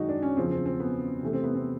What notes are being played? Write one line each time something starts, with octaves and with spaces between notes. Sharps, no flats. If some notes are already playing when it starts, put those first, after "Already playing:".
Already playing: F#2 D#3 G#3 D#4 F#4
D4
C#4
E2 C#3 F3 C4
C4
C4
B3
C3 E3 A3
C4
B3
C4